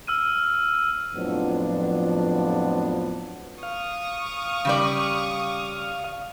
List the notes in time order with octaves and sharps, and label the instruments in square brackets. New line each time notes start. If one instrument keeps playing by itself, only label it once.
[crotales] E6 F6 D#7
[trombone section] F2 A2 F3 F#3 B3 D4
[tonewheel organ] F5 [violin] C#6 D#6
[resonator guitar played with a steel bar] C#3 G3 D5